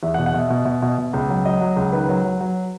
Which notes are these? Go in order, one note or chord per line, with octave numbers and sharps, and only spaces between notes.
E2 E5
F#5
B2
F#5
B2 E5
B2
B2
B2
B2
C#2
F#3
F#3 D#5
F#3
C#2
D#3 B4
F#3
F#3
F#3